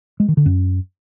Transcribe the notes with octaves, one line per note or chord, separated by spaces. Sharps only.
G#3
D#3
D3
F#2